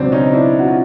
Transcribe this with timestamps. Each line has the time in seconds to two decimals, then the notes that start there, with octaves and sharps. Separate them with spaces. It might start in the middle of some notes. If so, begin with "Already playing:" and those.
Already playing: C#2 B2 F#3 C4 D4
0.12 C#4 D#4
0.33 D4 E4
0.59 F#4
0.68 F4